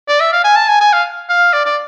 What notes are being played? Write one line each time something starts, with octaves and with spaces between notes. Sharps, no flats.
D5
E5
F5
G#5
A5
G#5
G#5
F5
F5
D5
D5